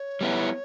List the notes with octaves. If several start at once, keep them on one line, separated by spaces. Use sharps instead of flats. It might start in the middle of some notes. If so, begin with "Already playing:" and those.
Already playing: C#5
G3 B3 E4